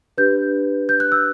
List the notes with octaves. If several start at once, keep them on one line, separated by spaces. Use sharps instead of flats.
D4 G4 B4 G6
G6
F#6
E6